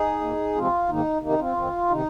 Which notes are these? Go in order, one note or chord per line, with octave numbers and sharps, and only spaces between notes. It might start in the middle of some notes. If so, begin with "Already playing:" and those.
Already playing: D#4 G#4
A#2 A#3
C3 F3 G#3 C4 F4
G#2 D#3 A#3 D#4
C3 D#3 A#3 D#4
C4 F4
F2 D#3 C4
C3 D#3 D#4